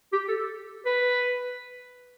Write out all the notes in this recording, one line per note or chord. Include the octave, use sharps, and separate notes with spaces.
G4
A4
B4